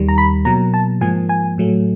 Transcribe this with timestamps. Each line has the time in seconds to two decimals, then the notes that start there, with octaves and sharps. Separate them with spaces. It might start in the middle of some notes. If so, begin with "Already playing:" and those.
Already playing: D#2 D#3 G3
0.09 A#5
0.18 B5
0.45 B2 F#3 A#3 A#5
0.74 A5
1.01 G#2 F3 A#3 G#5
1.29 G#5
1.58 A2 F#3 A3